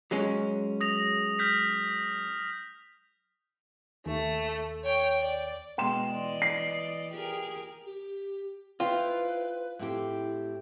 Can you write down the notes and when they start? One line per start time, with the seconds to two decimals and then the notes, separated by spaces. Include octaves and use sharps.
0.11 F#3 G#3 C#4
0.81 D#6 A#6 F7
1.39 F6 G6 B6
4.06 D#2 A3
4.83 C#5 G5
5.21 D5
5.78 B2 G#3 G5 C6 E7
6.11 E3 D5 D#5
6.42 C7
7.12 G4 G#4 A#4
7.86 G4
8.80 E4 F4 B4 C5 G5
9.79 A2 C4 E4 G4